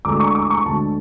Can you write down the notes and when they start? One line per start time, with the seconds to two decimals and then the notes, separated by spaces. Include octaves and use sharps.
0.05 D2 D3 G#3 D6
0.20 C#6
0.35 D6
0.50 C#6
0.65 D2 D3 G#3 A5